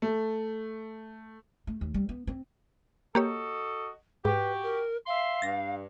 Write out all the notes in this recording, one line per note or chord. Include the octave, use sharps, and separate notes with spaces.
A3
A3
D#2
G3
B3
C4
A#3 F#4 G4 A4 C#5 D#5
G#2 F#4 G4 B4
A#4
E5 F5 C6
G2 A6 A#6